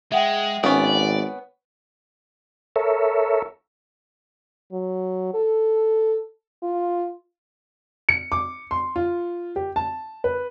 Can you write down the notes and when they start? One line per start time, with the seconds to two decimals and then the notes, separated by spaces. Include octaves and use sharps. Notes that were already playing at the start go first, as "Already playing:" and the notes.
0.12 G#3 E5 F#5 G5
0.64 G#1 B3 C#4 D5
2.76 A4 A#4 C#5 E5
4.72 F#3
5.34 A4
6.63 F4
8.09 C#7
8.32 D6
8.71 C6
8.96 F4
9.56 G4
9.76 A5
10.24 B4